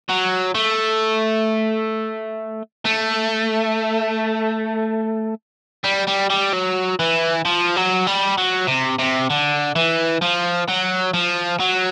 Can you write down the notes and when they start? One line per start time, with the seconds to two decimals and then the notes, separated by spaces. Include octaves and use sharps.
0.09 F#3
0.55 A3
2.85 A3
5.85 G3
6.08 G3
6.30 G3
6.53 F#3
6.99 E3
7.45 F3
7.76 F#3
8.07 G3
8.38 F#3
8.68 C3
8.99 C3
9.30 D3
9.76 E3
10.22 F3
10.68 F#3
11.14 F3
11.60 F#3